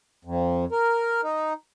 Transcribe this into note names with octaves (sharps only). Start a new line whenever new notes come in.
F2
A#4
D#4